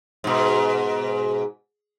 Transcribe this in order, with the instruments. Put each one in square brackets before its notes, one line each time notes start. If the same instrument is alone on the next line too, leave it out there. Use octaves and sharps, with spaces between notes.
[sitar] G#2 B2